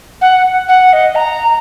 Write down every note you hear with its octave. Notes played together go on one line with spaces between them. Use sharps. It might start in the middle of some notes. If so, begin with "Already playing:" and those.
F#5
F#5
D#5
A#5